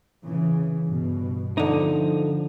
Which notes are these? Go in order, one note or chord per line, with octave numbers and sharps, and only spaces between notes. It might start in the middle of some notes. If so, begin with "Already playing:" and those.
C#3 E3
G2 B2
D3 F3 D#4